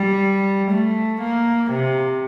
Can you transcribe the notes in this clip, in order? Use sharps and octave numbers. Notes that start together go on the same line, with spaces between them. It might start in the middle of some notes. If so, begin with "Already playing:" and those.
Already playing: G3
A3
A#3
C3